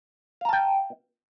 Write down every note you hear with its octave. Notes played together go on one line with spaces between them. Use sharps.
F5 G5 A5 A#5